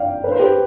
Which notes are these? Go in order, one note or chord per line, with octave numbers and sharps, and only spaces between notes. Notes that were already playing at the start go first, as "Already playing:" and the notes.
Already playing: D5 F5 G5
B4
C5
G4 B4